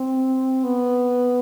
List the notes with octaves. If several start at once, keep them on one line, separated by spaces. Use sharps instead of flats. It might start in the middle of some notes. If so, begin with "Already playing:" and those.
Already playing: C4
B3